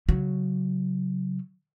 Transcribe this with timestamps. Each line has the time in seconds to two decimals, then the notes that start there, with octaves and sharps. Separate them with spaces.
0.09 C#3 F#3